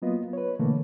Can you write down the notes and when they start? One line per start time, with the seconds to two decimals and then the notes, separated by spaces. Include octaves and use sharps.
0.02 F#3 A#3 B3 F4 D#5
0.33 B4 C#5
0.59 B2 D3 E3 A3 A#3